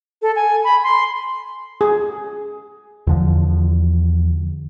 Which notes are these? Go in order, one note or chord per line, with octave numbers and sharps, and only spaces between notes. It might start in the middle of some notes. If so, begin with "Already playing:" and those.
A4
G#5
B5
C6
G#4
E2 D3 F3